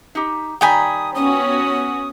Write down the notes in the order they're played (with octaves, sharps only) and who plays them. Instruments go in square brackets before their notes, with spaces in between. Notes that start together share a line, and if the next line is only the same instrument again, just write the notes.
[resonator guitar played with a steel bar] D#4 G4
[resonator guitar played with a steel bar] D#3 G3 A#5 [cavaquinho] G5 G#5 B5 [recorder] D#6
[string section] B3 C#4 F#4 [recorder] D#6